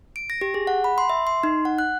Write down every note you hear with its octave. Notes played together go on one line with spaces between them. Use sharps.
D7
A#6
G4
G#4
F#5
B5
C6
E5
C6
D#4
F#5
F#6